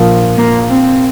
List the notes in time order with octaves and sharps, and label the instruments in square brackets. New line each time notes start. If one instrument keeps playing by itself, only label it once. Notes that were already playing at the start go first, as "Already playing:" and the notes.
Already playing: [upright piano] A#1 A#2 F3 A#3 F4
[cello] A#3
C4